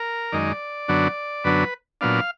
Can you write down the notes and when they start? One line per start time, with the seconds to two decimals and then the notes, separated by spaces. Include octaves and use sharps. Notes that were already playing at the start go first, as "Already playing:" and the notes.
Already playing: A#4
0.32 F#2 D#3 G#3 D#4 D5
0.88 F#2 D3 F#3 B3 D4
1.44 F#2 D3 F#3 B3 D4 B4
2.01 A#2 F#3 B3 D4 F5